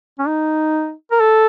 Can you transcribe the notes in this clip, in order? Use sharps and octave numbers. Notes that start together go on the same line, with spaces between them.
C#4
D#4
A#4
A4